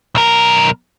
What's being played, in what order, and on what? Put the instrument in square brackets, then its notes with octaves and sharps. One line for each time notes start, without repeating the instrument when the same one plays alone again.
[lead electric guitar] B1 A#4